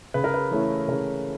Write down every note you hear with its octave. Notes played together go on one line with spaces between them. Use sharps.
C#3 B4
A#4
B4
E3 A3 C#4 E4
C#3 A#4